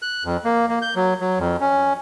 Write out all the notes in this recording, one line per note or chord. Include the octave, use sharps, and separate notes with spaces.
F#6
F2
A#3
A#3
G6
F#3
F#3
F2
C#4